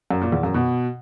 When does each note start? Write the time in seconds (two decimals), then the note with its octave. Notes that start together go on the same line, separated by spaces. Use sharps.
0.11 F#2
0.21 A#2
0.32 E2
0.43 F#2
0.54 B2